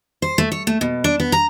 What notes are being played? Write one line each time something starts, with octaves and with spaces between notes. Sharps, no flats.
C5
A3
C#5
A3
B2
D4
B3
A#5